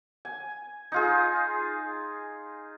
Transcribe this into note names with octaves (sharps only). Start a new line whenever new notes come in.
G#5
D#4 F4 G#4